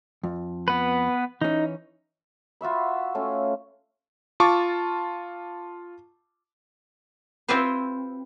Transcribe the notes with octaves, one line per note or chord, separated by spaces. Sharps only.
F2
B3 B4
E3 C#4 D#4
F4 F#4 E5 B5
A3 C#4 F4
F4 A5 C#6 D6
C4 E4 F4 G4 B4 C5